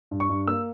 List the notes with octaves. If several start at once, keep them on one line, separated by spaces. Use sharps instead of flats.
G2
C#6
G2
A#3 E6